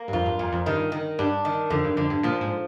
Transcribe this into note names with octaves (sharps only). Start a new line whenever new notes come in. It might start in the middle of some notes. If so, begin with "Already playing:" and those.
Already playing: A#3
G2
F2 F4
G2
F2 A#2
F2
G2 D#3
D#3
G2 D4
D#3
F2 D3
G2
F2 D3
G2
A#2 F3
G#2